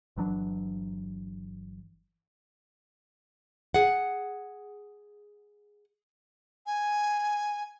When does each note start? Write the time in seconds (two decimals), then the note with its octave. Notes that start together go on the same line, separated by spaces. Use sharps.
0.16 G1 E3 F#3 D4
3.74 G#4 F#5
6.66 G#5